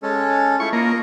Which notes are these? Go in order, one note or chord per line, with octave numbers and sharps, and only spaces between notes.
G#3 C#4 A4
A3 E4 F4 C#6
A#3 F4 D#5